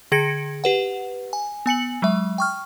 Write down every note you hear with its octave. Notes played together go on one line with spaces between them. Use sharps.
D3 G#4 G#6 A#6 C#7 D7
G4 B4 F#5
G#5
B3 G#5 C#7 F#7
F#3 G#3 E5
G5 C#6 F6